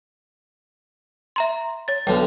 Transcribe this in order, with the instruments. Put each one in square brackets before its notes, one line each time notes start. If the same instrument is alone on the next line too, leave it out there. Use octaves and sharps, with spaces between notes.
[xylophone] E5 A#5 C6
C#5 A6
[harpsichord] B1 D3 F3 [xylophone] G5